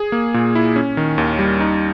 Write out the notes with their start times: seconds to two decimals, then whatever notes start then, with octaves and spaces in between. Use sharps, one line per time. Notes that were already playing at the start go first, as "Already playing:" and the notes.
Already playing: G#4
0.12 A#3
0.34 A#2
0.55 E4
0.76 C#4
0.97 D#3
1.18 D#2
1.39 G3
1.60 D#4